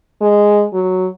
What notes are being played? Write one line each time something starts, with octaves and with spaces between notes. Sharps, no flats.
G#3
F#3